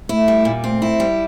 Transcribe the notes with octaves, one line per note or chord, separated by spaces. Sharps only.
A3 E4
G3
A#2
A3 C4
E4
G3